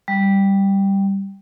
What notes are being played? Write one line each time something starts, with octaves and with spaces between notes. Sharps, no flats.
G3